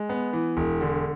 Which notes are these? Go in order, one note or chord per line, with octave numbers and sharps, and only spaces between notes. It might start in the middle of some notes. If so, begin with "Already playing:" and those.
Already playing: G#3
B3
E3
E1
D3